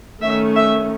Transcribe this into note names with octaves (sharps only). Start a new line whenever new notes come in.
D#3 A3 C#4 E5
E5